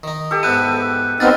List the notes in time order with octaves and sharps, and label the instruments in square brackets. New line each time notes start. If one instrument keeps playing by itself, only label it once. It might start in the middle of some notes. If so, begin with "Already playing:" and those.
[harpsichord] D#3 D#4
[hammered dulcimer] G4 A4
[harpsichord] G#2 B3 E4 [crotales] F#6 D#7
[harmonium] B3 C4 D#4 [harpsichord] E4 G4 G#4 [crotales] F6 A6